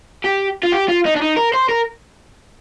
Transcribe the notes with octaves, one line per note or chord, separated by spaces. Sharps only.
G4
F4
G4
F4
D#4
D4
D#4
A#4
C5
A#4